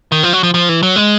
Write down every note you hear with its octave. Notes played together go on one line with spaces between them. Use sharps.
D#3
F3
F#3
F3
F3
E3
F#3
G#3